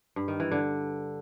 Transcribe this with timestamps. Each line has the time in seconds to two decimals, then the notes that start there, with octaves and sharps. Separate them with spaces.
0.16 G2
0.28 D#3
0.40 E3
0.51 D3